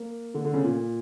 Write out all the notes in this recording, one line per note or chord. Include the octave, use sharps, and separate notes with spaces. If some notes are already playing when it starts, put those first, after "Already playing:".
Already playing: A#3
D3
D3
C#3
A#2